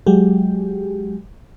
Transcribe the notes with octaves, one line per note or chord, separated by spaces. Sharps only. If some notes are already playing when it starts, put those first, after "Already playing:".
F#3 G#3 G4